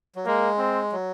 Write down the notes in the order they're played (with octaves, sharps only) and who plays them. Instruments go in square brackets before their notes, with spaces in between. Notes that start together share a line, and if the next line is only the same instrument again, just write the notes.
[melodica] F#3
[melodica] G#3 [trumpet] A#3
[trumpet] C4
[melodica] F#3